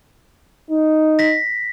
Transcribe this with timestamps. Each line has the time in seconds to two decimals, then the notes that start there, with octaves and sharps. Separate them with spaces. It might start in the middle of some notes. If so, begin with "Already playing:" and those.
0.70 D#4
1.19 A#6 B6